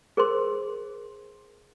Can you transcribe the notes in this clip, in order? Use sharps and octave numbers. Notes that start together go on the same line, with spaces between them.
G#4 A#4 C5 C6